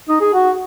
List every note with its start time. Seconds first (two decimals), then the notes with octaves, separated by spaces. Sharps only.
0.09 D#4
0.21 G#4
0.33 F#4